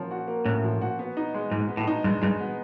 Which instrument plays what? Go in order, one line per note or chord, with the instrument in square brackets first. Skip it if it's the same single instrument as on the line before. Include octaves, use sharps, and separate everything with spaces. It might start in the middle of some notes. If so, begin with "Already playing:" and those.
Already playing: [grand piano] F3 A#3 C#4 F#4
F#4
A#3
[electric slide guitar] A2 [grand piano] C#4
[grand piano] F3
F#4
B3
D#4
G#3
[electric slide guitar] G#2 [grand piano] G#3
[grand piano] B3
[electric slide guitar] A2
[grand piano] D#4
[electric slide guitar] G2 [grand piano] G#3
[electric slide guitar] G2 [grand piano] G#3
[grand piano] B3